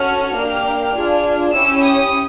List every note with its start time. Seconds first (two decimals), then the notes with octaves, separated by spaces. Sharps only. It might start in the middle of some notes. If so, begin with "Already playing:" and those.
Already playing: C#4 F#4 A4 F6
0.35 A#3 D4 G4
0.95 D4 F4 G#4
1.55 C#4 E4 G4 E6
1.85 D#6